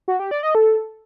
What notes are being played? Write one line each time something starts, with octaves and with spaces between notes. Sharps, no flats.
F#4
G4
D5
D#5
A4